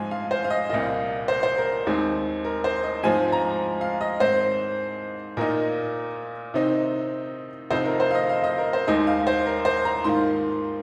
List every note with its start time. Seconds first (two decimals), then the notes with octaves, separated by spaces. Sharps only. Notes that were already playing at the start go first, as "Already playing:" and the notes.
Already playing: G#2 F3 G#3 C4 F4 G#5
0.11 F5
0.31 C5
0.44 F5
0.50 D#5
0.69 C2 A#2 A#3 F4 D#5
1.28 C5
1.43 C5
1.58 A#4
1.86 D#2 D#3 G#3 C4
2.45 A#4
2.64 C5
2.83 D#5
3.03 G#2 F3 G#3 C4 G#5
3.32 A#5
3.81 F5
4.01 D#5
4.20 G#2 D#3 C4 C5
5.37 A#2 A#3 D#4 A#4
6.54 C3 D#3 C4 D#4
7.71 F2 C3 F3 C4 D#4 C5
7.85 A#4
8.00 C5
8.11 F5
8.15 D#5
8.29 F5
8.44 D#5
8.58 A#4
8.73 C5
8.88 D#2 D#3 G#3 D#4 D#5
9.07 F5
9.27 C5
9.46 A#4
9.65 C5
9.85 A#5
10.04 G#2 D#3 A#3 F4 C6